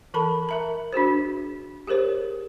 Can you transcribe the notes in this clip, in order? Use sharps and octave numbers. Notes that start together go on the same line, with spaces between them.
E3 A4 A#4 A5 B5
A#4 E5 A#5
D4 F#4 G#4 C5
G4 G#4 A#4 C5 C#5